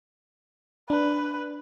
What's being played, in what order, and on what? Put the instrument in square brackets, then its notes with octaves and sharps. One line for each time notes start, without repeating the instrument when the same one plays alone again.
[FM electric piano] D4 [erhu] B4